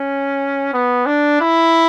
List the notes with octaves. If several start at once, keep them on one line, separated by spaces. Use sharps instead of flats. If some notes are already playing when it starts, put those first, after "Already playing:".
Already playing: C#4
B3
D4
E4